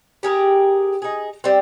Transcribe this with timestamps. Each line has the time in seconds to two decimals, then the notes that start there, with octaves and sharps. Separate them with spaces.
0.23 G4 G#4 A#4
1.02 D#4 G#4
1.44 G3 C4